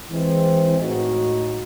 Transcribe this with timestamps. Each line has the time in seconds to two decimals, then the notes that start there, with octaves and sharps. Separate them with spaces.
0.10 E3 G#3 C4
0.79 A2 G#3 D#4 F#4